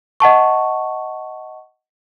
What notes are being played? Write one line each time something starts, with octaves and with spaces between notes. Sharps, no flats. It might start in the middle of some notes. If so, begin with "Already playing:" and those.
D#5 F#5 A5 C#6